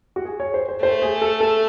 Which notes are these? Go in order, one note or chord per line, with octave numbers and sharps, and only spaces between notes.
F#4
G#4
C#5
C5
C5
A3 C5
G#4
A4
A4